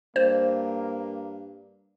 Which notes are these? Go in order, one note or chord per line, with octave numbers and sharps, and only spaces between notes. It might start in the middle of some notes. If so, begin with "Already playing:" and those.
G2 A#3 C5